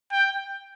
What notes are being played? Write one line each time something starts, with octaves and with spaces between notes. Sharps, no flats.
G5